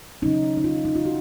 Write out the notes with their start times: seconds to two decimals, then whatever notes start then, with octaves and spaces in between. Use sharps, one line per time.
0.22 C#3 F#3 C#4 D#4
0.57 D#4
0.64 F4
0.85 D#4
0.96 F4
1.06 F#4